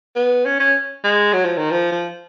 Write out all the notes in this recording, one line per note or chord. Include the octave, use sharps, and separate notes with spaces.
B3
C#4
C#4
G#3
F#3
F3
D#3
F3
F3